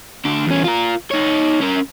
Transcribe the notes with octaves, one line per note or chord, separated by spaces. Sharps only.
D2 D4
E2 C#4
F4 A#4
D#4 C#5
C#4 A#4